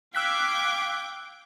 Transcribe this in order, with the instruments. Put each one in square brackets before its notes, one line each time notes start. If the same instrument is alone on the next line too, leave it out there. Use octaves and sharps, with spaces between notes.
[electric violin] F5 G#6 [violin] G5 D6 [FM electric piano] E6 F#6 B6